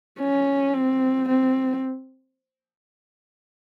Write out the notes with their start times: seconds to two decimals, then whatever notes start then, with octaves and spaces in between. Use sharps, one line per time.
0.19 C#4
0.74 C4
1.28 C4